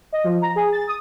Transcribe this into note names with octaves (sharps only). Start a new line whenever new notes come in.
D#5
F3
A#5
G#4
A6
D#6